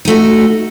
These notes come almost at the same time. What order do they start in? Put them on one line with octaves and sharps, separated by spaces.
D#4 A3 F#4